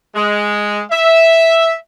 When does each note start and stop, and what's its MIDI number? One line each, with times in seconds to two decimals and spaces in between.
0.16 0.82 56
0.91 1.74 76